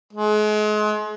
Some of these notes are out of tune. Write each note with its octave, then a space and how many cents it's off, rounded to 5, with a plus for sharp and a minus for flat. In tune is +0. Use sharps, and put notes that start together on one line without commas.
G#3 +35